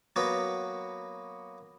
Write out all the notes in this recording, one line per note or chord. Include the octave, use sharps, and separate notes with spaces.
F#3 A#3 B3 F#4 B4